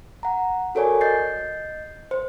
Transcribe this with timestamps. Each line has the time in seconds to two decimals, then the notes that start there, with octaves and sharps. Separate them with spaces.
0.23 F#5 A#5
0.75 F#4 A4 A#4 C#5 D5 G#5
1.01 D#5 G6 A6 C7
2.11 C5